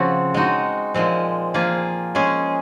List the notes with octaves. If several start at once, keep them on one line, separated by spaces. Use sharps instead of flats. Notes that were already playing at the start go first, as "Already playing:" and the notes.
Already playing: C#3 F3 C4 F#4
G#3 D#4 F#4
A#2 F3 G#3 C4
F3 A#3 F4 G#4
G#3 C#4 G#4